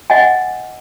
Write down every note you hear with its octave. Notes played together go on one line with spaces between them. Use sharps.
D#5 F#5 G#5